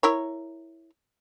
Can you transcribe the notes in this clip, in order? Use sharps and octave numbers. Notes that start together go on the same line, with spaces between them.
E4 A#4 C#5